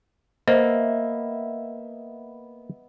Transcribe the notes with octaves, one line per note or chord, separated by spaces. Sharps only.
A#3 B3 C5 D#5 E5 E6